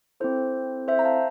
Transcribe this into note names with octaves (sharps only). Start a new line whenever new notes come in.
C4 E4 A4 C5
C5 E5
A#5
F5 A5